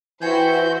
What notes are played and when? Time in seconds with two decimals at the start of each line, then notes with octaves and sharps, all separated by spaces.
0.22 E3 E4 F#4 G#4 C5 G5 G6